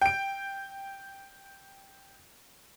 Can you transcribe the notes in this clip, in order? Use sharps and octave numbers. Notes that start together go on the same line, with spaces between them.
G5 D7